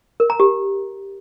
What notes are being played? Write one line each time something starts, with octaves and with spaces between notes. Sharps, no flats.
A#4
A#5
G4